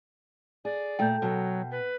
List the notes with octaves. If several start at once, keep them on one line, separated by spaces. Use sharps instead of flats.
G#4 D5
A#2 A3 G5 G6
B2 F#3
B4